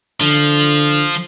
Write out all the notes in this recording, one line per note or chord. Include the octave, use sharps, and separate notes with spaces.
D3 F3